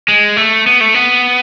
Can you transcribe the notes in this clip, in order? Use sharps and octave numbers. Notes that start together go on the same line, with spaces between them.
G#3
A3
B3
A3
B3